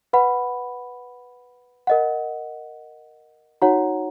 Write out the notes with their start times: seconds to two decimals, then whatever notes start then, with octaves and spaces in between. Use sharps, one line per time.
0.13 B4 F#5 B5
1.87 A#4 D#5 F#5
3.62 D#4 F#4 C#5 F#5 A#5